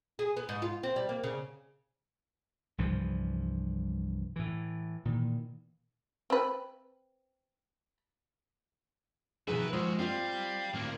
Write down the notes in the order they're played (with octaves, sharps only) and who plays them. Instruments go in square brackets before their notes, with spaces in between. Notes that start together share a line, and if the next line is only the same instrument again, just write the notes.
[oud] G#4
B3
G#2
F4
C4
G3
A#3
C#3
[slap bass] C2 G2 E3 F3
A2 E3
A#2 D#3 E3
[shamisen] C4 B4
[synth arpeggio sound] B2 F3 G#4 [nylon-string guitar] D#3 [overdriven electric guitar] E4 F#4 [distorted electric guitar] B4
[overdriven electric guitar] D#2 F#4 [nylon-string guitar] F3 [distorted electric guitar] G#3 [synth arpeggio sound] C5 E6
[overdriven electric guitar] G3 [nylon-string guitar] C4 F4 [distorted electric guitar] F5
[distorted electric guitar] A2 C4 [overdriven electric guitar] A#3